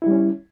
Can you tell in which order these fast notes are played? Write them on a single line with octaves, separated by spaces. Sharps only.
E4 G3 C#4